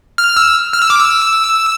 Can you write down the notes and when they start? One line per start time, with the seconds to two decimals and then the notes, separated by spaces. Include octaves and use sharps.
0.18 F6
0.36 E6
0.73 F6
0.82 E6
0.90 D6
0.99 E6